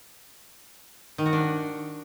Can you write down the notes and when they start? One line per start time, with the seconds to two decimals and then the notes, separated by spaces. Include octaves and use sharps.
1.18 D#3
1.26 F#4
1.33 D4